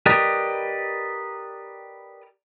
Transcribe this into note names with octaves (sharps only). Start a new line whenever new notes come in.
G4 A#4 B4 D5 D#5